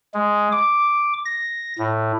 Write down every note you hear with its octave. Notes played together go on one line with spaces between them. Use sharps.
G#3
D6
A#6
A2